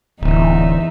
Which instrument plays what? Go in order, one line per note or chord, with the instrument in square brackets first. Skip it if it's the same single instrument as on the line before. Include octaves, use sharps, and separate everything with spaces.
[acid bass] D1 [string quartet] E2 D#4 E5